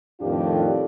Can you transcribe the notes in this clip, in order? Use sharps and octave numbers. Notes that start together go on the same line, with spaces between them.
F2 A2 D#3 D4 F4 G4